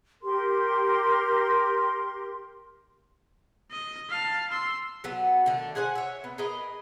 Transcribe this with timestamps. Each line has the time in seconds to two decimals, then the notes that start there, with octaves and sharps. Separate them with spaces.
0.23 G4 A#4 C6
3.71 D#5
4.10 F5 A5
4.51 C6 E6
5.04 F#3 A3 B3
5.46 D3 D#3 A3
5.75 G#4 C5 F#5 G#5
5.95 C#5 E5
6.24 B3
6.38 G#4 A#4 B4 D#5